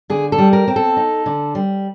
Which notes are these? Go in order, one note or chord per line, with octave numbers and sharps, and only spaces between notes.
D3 G#4
A4
G3
A#4
C4
A4
D#4
D3
G3